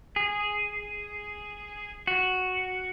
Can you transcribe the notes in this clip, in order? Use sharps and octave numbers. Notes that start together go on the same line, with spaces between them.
G#4
F#4